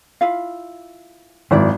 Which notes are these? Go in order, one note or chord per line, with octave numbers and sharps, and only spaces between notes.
E4 F4 F5
G#1 F#2 E4 D5